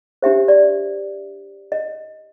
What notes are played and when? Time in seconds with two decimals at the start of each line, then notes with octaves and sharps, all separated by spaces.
0.22 D4 G4 C5 E5
0.48 D5
1.72 D#5